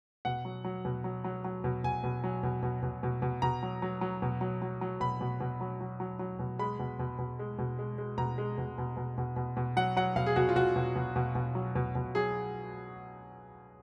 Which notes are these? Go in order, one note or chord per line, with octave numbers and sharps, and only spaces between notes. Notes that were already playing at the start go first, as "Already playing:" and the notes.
B2 F#5
F#3
F#3
B2
F#3
F#3
F#3
B2
B2 G#5
B2
F#3
B2
B2
B2
B2
B2
B2 A#5
F#3
F#3
F#3
B2
F#3
F#3
F#3
B2 B5
B2
B2
F#3
F#3
F#3
F#3
B2
G#3 B5
B2
B2
B2
G#3
B2
G#3
G#3
B2 A#5
G#3
B2
B2
B2
B2
B2
B2
F#3 F#5
F#3 F#5
B2 F5
G#4
B2 F#4
F4
B2 F#4
B2
B2
B2
B2
F#3
B2
B2
F#3 G#4